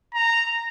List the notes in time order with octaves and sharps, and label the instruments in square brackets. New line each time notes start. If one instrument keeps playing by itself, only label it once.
[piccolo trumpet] A#5